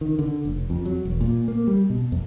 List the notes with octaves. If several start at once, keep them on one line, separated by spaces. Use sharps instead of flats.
D#3
D3
F1
F2
F#3
E1
A#2
A#3
G3
B2
F2